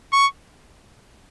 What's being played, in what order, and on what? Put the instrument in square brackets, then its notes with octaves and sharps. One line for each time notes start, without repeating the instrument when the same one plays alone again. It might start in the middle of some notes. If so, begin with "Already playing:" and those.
[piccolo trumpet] C#6